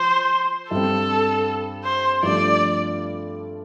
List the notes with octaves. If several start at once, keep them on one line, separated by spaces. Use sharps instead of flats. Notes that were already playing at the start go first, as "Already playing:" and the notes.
Already playing: F3 C5
G2 G3 C4 A4
C5
G2 F3 A3 D4 D5